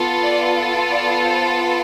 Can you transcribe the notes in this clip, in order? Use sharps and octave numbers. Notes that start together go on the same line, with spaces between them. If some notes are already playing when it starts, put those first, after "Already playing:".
Already playing: B3 F4 A4
D5
D5
C5